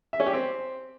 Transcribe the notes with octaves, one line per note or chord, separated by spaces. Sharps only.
E5
C#4
G4
C4